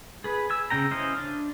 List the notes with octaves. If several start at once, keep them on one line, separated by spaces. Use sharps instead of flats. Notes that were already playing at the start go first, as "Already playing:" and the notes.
G#4 B4
G#5 E6
C#3 C#4 G5 A#5
C#4 E4 C5 D#5 F5
D4